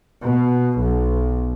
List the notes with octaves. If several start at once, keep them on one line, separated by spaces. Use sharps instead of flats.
B2
B1